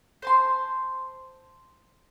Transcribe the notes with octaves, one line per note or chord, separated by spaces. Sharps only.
C5 A5 C6